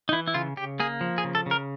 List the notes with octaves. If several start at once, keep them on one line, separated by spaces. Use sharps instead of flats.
D#4
E3 E4
E4
C#3 F4
C#3 G4
A#3 G#4
F3
G#4
C#3
A4
C#3 A#4